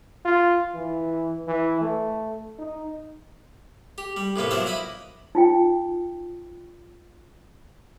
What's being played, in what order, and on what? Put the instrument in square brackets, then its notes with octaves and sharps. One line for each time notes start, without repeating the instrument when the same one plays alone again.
[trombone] F4
E3
E3
A3
D#4
[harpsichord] G4
G3
A2 C3 A#3 B3
F3 F#3 D4 A#4 C5 E5
E4 D#5 B5 D6
[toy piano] D#4 F4 G5